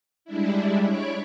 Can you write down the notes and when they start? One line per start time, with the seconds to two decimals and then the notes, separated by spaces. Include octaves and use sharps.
0.25 G3 G#3 D4 E4
0.86 C#5 D5 B5 C#6 D6